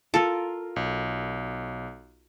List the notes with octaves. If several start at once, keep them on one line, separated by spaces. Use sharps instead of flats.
F4 A4 A#4
B1